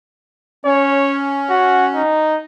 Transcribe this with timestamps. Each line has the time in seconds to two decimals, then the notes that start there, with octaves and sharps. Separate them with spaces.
0.65 C#4 C#5
1.50 F#4
1.95 D#4